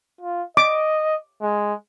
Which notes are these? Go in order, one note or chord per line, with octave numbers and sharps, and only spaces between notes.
F4
D#5 D6
G#3